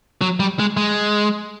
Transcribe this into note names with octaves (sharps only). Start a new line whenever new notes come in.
F#3
G3
G#3
G#3